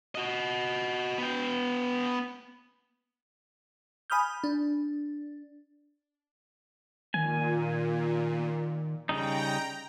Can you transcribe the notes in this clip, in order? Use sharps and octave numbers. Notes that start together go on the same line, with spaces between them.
F#4 D#5
B3 G5
G#5 B5 D#6 F6 G6
D4
A#2 D#3 G#5
C#3 G3 D#4 G5 A#5